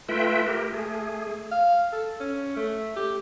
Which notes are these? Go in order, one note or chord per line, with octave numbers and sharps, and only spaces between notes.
A3 F4 B4 E5 G5
G4 A#4
A3 G#4
F5
A4
C#4
A3
G4